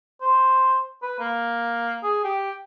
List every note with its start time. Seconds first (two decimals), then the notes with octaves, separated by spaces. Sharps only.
0.21 C5
1.03 B4
1.19 A#3
2.03 G#4
2.24 G4